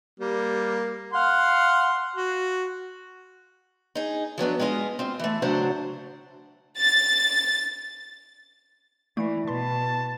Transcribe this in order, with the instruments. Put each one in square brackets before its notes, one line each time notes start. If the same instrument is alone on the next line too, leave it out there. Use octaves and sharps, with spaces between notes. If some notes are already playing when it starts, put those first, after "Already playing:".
[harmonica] G3 A#3
F5 F#5 C6
F#4
[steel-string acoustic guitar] D#4 G#4
F3 F#3 B3 D4
G#3 B3 F4 D#5
C4 F4
E3 A3
A2 C#3 F#3 D4 C5 F#5
[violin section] A6
[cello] E3 [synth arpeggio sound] A3 A#3 C7 [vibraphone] E4 D5
[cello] B2 [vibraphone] B4 [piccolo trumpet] A5 [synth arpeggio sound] C6 B6